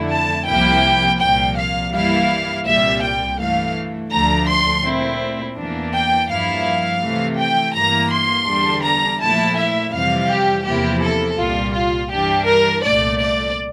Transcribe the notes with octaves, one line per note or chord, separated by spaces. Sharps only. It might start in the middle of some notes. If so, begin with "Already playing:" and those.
Already playing: F2 D3 A3 E4
A5
C2 C3 F3 A#3 E4 G5
C2 A#2 F3 A#3 G5
F5
G2 E3 G3 A#3 E4 F5
C2 A#2 G3 E5
G5
G2 E3 A3 F5
D2 D3 F3 A3 D4 A#5
C6
A#2 A3 C4 E4
E2 E3 A#3 D4
G5
G2 F3 A#3 E4 F5
C3 E3 A3
G5
G2 E3 A#3 A#5
C6
E2 D3 G3 D4
A#5
A#2 F3 A3 E4 A5
E5
F2 C3 E3 G3 F5
G4
E2 C3 F3 A#3 E4 G4
A4
C2 A#2 G3 F4
F4
G2 E3 G3 D4 G4
A#4
C2 A#2 A3 D5
D5